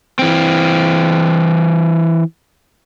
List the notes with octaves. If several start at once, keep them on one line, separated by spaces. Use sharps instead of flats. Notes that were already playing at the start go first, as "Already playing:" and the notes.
E3 C4